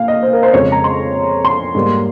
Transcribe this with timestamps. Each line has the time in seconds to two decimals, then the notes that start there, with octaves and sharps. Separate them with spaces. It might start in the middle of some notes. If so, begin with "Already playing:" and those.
Already playing: A#2 A#3 F5
0.08 D#5
0.23 C5
0.33 A#4
0.43 C5
0.53 F2 C#3 G#3 C#5
0.72 A#5
0.84 C6
1.45 C6
1.75 G#2 G3 A#3